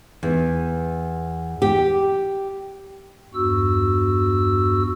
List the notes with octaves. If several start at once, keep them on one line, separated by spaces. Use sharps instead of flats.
E2
G4
E2 G2 F#4 E6